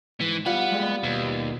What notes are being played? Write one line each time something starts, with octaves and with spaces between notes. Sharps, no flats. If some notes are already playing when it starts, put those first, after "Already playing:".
G#2 E3
G3 B3 F4 F#5
G#3 G4 G#4
D#2 B2